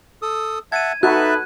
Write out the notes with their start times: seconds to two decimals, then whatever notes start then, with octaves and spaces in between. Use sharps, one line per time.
0.22 A4 D#6
0.72 E5 F#5 A5 G#6 D#7
1.03 D#4 F#4 A4 B4 E5 A5 F#6